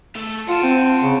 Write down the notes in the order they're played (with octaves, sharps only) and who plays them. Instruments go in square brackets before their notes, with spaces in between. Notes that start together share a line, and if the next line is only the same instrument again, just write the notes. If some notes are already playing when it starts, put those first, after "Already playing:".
[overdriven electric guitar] A3 A4
[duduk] F4 [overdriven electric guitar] F#5 A5
[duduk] C4
C#3